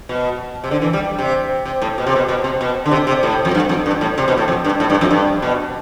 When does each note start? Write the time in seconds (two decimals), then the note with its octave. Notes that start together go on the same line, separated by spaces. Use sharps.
0.09 B2
0.64 C3
0.71 D3
0.82 E3
0.93 G3
1.19 C3
1.65 C3
1.82 A2
1.98 B2
2.07 C3
2.16 B2
2.29 B2
2.44 C3
2.61 B2
2.86 D3
2.91 C3
3.07 C3
3.23 A2
3.45 F2
3.55 G2
3.69 F2
3.86 G2
4.01 A2
4.18 C3
4.28 B2
4.38 A2
4.48 F2
4.65 G2
4.80 A2
4.90 G2
5.01 F2
5.11 G2
5.42 B2